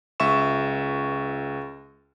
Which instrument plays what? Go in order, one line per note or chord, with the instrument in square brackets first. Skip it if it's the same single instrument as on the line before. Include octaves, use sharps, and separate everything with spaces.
[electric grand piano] C#2 E5 C#6 E7